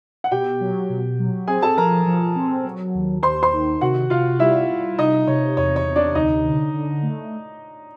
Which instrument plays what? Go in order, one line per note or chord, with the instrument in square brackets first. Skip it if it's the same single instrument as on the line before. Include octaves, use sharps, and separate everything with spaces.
[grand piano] F#5
[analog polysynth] B2 [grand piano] G4 G5
[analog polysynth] F#3
B2
F#3
[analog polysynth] C4 [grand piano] G#4 G#5
[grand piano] A4 A5
[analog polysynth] F3 [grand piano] A#4 A#5
[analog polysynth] F3
C4
F#3
D#2
[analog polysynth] D#2 [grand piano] C5 C6
[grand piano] C5 C6
[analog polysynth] D#3
[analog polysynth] C3 [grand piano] F#4 F#5
[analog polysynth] C3 [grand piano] F4 F5
[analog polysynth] G3 [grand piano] E4 E5
[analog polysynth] G3
[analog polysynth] C3 [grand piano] D#4 D#5
[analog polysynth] C3 [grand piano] C#5
[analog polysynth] E2 [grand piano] C#5
[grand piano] C#5
[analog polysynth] C3
[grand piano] D4 D5
[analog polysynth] D2 [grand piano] D#4 D#5
[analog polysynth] D3
D3
A3